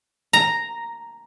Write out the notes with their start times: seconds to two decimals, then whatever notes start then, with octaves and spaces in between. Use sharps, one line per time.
0.33 A#5